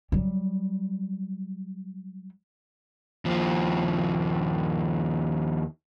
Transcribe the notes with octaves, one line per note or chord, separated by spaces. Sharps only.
F#3 G3
D#2 F3